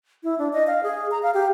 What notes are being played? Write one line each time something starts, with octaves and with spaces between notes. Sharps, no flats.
E4
D4
D#5
F5
G#4
A#5
F5
G4